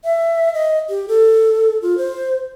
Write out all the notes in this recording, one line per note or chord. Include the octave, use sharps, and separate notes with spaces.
E5
D#5
G4
A4
F4
C5